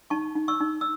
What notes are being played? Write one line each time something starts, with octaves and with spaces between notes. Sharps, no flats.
D#4 A5 C#6
D#4
C#6 E6
D#4
E6